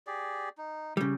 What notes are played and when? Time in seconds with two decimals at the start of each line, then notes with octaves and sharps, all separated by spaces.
0.07 G4 G#4 D5
0.58 D#4
0.97 C#3 G3